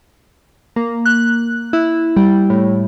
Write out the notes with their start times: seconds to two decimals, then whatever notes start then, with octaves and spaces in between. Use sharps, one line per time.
0.76 A#3
1.06 F#6
1.73 E4
2.17 G3
2.50 A2